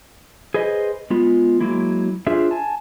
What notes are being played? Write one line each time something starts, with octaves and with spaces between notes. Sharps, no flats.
G#4 B4 C5 D#5
G#3 B3 F4
F#3 G#3 A#3 E4
D4 F4 G#4 C5 E5
G#5 A5